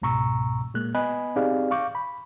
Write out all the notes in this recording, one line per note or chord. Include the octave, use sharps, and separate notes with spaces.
C#2 G#2 B2 A#5 C#6 E6
A#2 G#3 A#3 F#6
B3 D#5 G#5 B5 F#6
C4 D#4 G4 G#4 D5 F5
F5 C#6 D6 G6
B5